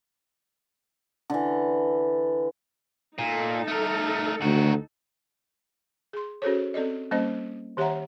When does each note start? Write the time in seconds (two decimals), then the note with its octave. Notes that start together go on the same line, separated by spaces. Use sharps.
1.30 D3 E3
3.18 A#2 D#4 A4
3.68 A3 A#4
4.42 D2 D#3 F#4
6.13 G#4 C6
6.42 C#4 F#4 G#4 A4 C5 C#5
6.74 C4 A4 D5 D#5
7.11 G3 A#3 C#4 C5 D#5
7.77 D#3 G4 C#5 E5 F#5 A#5